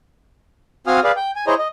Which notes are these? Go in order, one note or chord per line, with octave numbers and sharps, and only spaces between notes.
C4 F#4 F5 G#5 D#6 F6
G#4 B4 D5 F5
G5
G#5
E4 G#4 C5 C#5 D#5 A#5
D#5